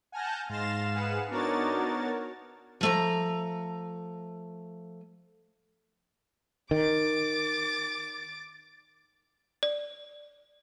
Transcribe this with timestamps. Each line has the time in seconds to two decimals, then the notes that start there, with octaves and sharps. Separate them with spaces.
0.12 F#5 G#5 A5 F6 G6 A#6
0.49 G#2 F5 C6 A6 A#6 E7
0.94 G#4 B4 F#5
1.31 B3 D4 D#4 F#4 A#4 C#5 A6
2.81 F3 A3 A#5
6.71 D#3 D6 A6
9.63 D5